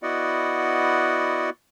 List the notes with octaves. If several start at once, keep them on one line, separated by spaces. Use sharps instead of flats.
B3 E4 F#4 D5 D#5 F#5